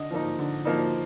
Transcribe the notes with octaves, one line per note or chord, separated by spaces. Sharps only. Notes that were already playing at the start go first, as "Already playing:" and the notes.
Already playing: D3 D#5
F3 A#3 D#4
D3
F3 A#3 D#4